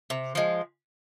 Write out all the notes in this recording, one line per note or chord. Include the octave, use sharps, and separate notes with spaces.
C3
F3 G#3